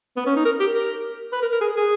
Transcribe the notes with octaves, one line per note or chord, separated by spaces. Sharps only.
B3
C#4
D#4
A#4
G4
A#4
B4
A#4
A#4
G#4
G#4